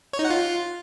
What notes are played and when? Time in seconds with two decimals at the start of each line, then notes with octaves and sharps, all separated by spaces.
0.13 C#5
0.19 D#4
0.25 F#5
0.30 F4